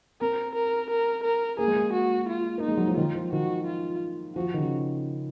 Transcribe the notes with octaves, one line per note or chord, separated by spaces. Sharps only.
C4 A#4
A#4
A#4
A#4
A#3 G#4
G#3
A#3
F#4
F4
A#3 D#4
G#3
F#3
F3
D#3 F4
F3
D#3 F#4
F4
F3 F#4
D#3
C#3